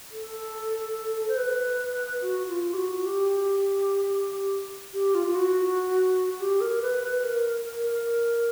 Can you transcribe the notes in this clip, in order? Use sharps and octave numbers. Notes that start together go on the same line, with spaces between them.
A4
C5
B4
F#4
F4
G4
F#4
G4
G4
F4
F4
F#4
G4
A#4
B4
B4
A#4
A#4